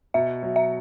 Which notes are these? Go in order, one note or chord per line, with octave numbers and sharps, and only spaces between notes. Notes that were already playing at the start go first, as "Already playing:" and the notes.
B2 E5
F#3
E5